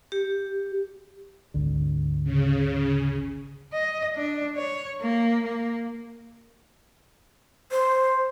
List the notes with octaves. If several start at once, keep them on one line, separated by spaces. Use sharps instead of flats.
G4
G#1 D2 D3
C#3
D#5
D4
C#5
A#3
A#3
C5